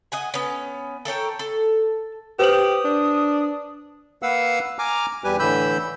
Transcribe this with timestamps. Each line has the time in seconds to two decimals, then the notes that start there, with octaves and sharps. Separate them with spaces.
0.12 D#5 F#5 G#5
0.34 B3 C#4
1.05 A4 A#4 C#5 G5
1.39 A4
2.39 G4 B4 C5 D#6 F#7
2.85 D4
4.23 A#3 B4 F5 F#5 E6
4.79 G#5 A#5 D6 F6
5.24 E2 G3 G4 B4 G#5
5.39 A2 D3 E3 B5 E6 G6